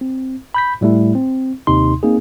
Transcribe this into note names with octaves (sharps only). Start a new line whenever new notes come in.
C4
B5 G6 B6
A2 G3 A3 E4
C4
D#2 C3 D#4 C6
A#3 C4 D#4 G#4